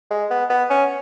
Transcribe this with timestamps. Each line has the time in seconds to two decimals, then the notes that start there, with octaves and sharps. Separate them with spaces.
0.11 G#3
0.30 B3
0.50 B3
0.70 C#4